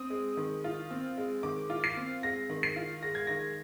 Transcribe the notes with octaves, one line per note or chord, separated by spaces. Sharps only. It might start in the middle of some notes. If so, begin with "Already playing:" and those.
Already playing: C4 D#6
G#3
D#3
F4
C4
G#3
D#3 D6
F4
C7
C4
G#3 A#6
D#3
C7
F4
G#3 A#6
G#6
D#3 A#6